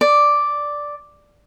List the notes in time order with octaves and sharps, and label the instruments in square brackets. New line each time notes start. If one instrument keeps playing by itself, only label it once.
[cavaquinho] D5